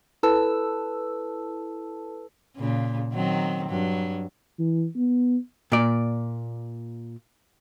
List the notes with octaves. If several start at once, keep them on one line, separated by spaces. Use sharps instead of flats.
E4 A4 B4 A5 E6
A#2 C#3
D#3 F#3 C4
G2 F#3
E3
B3
A#2 D5